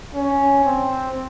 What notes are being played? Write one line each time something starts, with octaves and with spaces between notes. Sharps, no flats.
C#4
C4